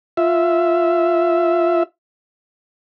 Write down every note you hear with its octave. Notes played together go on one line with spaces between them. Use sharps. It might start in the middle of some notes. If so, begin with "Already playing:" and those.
F4 E5